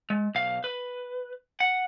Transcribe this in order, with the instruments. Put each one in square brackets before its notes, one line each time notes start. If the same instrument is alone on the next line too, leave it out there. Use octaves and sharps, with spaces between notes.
[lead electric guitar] G#3
B1 F5
B4
F#5